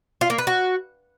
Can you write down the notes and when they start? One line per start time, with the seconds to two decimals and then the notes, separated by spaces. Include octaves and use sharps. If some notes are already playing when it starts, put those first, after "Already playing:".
0.21 F4
0.30 A#3
0.38 B4
0.47 F#4